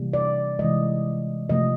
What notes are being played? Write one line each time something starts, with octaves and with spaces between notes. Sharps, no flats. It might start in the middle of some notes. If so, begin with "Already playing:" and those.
Already playing: C3 E3 G3 A#3
D5
C3 E3 G#3 D#5
C3 F3 A3 D#5